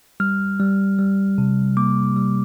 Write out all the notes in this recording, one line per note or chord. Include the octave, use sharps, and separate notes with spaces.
G3 F6
G3
G3
C3
A#3 D6
G3